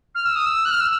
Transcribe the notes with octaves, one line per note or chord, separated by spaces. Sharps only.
F6
E6
D#6
E6
F#6
F6
E6